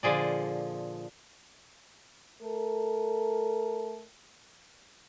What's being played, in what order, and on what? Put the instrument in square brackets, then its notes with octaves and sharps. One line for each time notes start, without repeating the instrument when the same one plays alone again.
[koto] A#2 D3 F3 G#4 D5
[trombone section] A3 A4 A#4